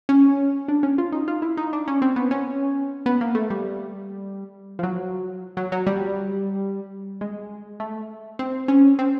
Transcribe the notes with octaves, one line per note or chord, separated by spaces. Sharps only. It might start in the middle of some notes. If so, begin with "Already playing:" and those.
C#4
D4
C#4
F4
D#4
F4
E4
D#4
D4
C#4
C4
B3
C#4
B3
A#3
A3
G3
F3
F#3
F#3
F#3
G3
G#3
A3
C4
C#4
C4